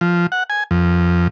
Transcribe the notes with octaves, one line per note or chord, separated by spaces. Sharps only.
F3
F#5
G#5
F2